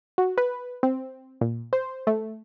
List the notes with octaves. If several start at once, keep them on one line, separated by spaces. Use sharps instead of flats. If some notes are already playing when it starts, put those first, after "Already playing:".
F#4
B4
C4
A#2
C5
A3